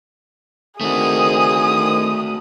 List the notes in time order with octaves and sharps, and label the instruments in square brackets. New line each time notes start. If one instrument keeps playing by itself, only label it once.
[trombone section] D#3 C4 [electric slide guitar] A3 F#4 [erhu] G#4 [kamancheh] D#6